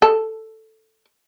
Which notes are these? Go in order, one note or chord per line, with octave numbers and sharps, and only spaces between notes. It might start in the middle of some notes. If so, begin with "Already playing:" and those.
A4